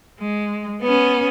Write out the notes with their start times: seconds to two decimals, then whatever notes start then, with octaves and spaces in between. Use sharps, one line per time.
0.20 G#3
0.82 B3 C#4